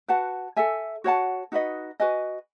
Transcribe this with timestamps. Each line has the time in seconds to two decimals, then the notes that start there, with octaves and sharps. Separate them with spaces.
0.08 F#4 B4 F#5 A5
0.57 A4 E5 G#5
1.04 F#4 C#5 F#5 A5
1.52 D#4 F#4 B4 D#5
2.00 F#4 B4 D#5 G#5